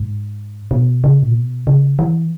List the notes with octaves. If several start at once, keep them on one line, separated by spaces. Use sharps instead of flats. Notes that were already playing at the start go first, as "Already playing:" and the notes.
Already playing: G#2
B2
C#3
A#2
B2
C#3
E3